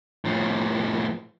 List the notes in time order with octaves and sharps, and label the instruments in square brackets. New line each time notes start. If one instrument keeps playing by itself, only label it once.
[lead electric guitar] A2 F3